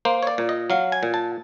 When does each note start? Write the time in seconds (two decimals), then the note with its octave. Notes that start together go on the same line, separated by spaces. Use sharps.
0.05 A#3 C5
0.23 C#5
0.27 D5
0.38 A#2
0.49 D#5
0.70 F#3 F5
0.92 G#5
1.03 A#2
1.14 A5